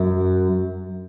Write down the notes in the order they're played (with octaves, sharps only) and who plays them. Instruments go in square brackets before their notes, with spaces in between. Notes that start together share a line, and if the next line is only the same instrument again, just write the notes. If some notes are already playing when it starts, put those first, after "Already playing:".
Already playing: [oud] F#2